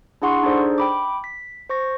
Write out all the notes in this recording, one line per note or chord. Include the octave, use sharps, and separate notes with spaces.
D4 E4 G#4 F#5 C6 C#6
D4 D#4 G#4 A4 C5 D5
G5 B5 D6
B6
C5 C#6 A#6